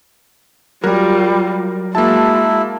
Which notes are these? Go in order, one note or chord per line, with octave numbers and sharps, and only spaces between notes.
F#3 G3 F4 A#4
G#3 A#3 E4 F#4 A5